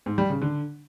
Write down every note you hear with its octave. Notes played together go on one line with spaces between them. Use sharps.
G#2
G3
C#3
D3